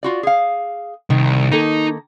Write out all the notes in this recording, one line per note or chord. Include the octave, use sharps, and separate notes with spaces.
F4 F#4 D5
G#4 F5
C2 D#3
D#3 A#3 D#4 A4